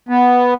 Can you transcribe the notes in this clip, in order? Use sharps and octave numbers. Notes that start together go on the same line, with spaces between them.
B3